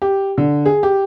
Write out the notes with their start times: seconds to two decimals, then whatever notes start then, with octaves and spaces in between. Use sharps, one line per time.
0.02 G4
0.38 D3
0.66 G#4
0.83 G4